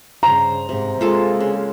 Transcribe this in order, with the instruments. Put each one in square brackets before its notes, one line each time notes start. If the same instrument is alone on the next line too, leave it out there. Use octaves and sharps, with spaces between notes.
[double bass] G2 C#3 [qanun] C5 [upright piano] A#5
[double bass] G#2 [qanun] C3
[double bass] G#3 A#3 [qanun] F4 A4 A5
[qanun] C#3